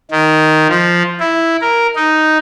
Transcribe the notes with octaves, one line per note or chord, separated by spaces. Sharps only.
D#3
F3
E4
A#4
D#4